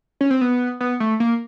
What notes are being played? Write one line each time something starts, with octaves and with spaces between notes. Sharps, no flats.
C#4
C4
B3
B3
A3
A#3